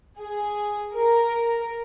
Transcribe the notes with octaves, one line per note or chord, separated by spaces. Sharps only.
G#4
A#4